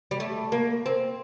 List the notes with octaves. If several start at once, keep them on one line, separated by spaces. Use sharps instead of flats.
G3
A3
A#3
C4